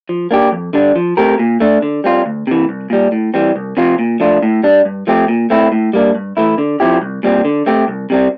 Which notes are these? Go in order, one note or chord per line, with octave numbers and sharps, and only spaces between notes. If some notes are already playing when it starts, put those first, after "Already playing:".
F3
A#3 D4 G4
F2
D3 G3 D4
F3
A3 C4 G4 A#4
A#2
A3 D4
D3
G3 C4 F4
D2
C3 E3
C2
A#2 G3
A2
E3 G3 C4
C2
C3 F3 C4 F4
A#2
F3 A3 D4 F4
A2
G3 D4
G2
F3 A3 C4 G4
A#2
A3 C4 E4
A2
G3 A#3 D4
G2
E3 A3 E4
D3
F3 C4 E4 G4
C2
A#2 G3 C4
D3
A3 C4 G4
C2
C3 G3 C4